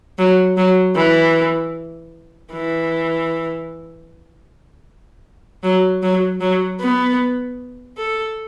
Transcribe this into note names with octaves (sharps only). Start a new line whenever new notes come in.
F#3
F#3
E3
E3
F#3
F#3
F#3
B3
A4